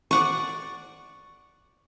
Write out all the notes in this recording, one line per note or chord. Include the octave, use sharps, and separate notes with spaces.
D5 F#5 C#6